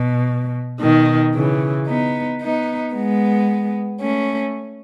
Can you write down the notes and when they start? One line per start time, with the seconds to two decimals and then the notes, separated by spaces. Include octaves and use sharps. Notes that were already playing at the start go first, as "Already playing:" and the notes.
Already playing: B2
0.81 B2 D#3
1.34 C#3 E3
1.87 B3 D#4
2.41 B3 D#4
2.94 G#3 B3
4.01 A3 C#4